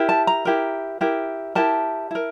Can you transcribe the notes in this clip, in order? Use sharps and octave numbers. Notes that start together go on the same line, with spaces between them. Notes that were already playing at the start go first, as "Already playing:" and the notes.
Already playing: E4 G4 A#4
A5
A#5
E4 G4 A#4
E4 G4 A#4
E4 G4 A#4 A5
E4 A#4